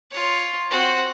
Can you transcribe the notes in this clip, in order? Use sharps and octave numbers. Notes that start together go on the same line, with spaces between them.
F4 C#5
C4 F#4